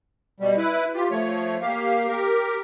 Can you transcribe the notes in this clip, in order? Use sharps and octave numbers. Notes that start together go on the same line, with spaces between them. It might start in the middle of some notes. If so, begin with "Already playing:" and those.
B2 G3
E4 B4
F4 G4
F3 A3 C#5
A#3 G4 F5
G4 A#4